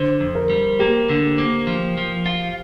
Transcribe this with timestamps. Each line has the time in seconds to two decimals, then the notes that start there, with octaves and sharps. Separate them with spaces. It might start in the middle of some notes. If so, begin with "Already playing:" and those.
Already playing: D3 C5
0.20 F2
0.35 A#4
0.50 G3
0.79 A#3 G4
1.09 D3
1.38 A#3
1.67 F3
1.97 F3
2.26 F4